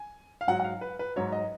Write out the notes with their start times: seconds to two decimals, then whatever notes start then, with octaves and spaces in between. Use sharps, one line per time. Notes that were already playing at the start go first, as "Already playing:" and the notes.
Already playing: G#5
0.41 F5
0.48 G#2 F#3 F#5
0.60 F#5
0.64 F5
0.81 B4
0.99 B4
1.16 G#2 F#3 C#5
1.32 D#5